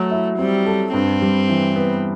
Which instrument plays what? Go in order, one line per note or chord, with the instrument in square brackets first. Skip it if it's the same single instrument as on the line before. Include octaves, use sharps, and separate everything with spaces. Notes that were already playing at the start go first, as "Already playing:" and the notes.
Already playing: [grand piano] F#3 F#4 [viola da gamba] A3
[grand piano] E4
[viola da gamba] G3 [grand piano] C4
[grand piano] A4
[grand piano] G2 [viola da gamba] C4
[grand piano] G3
E3
B3